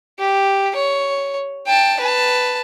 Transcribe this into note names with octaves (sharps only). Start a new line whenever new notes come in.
G4
C#5
G5 A5
B4 A5